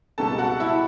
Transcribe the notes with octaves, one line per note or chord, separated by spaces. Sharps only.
C#2 B2 G3 B3 A4 A5
F#4 F#5
E4 E5